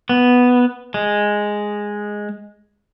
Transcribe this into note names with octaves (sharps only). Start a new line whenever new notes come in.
B3
G#3